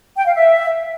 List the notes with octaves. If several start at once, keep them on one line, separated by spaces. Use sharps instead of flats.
G5
F5
E5